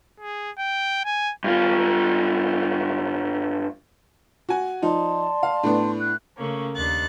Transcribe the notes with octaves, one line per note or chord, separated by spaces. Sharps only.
G#4
G5
G#5
G2 F4
F#4 G#5
F3 D#4 D5 A5 C6
F5
A2 B3 D4
F#6
C#3 A3 A#3 C#4
D#2 D4 F#6 A6